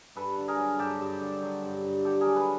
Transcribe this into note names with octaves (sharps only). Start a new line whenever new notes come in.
G2 A4 B4
D3
G#4 A#4
F#3
G2 G4 A4
G2
D3
F#3
G2
G2
D3 G4 A4
F#3 G#4 A#4
A4 B4